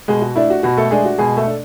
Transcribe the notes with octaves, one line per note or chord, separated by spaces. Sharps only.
B2 G#3 G#4
F#4
A3 D4 E4
F#4
B2 F#4
A3 A4
G#3 A3 D4 G#4
F#4
B2 G#3 G#4
A3 A4
D4